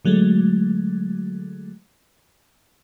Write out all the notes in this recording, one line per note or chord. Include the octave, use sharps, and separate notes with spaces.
D3 F#3 G#3 A3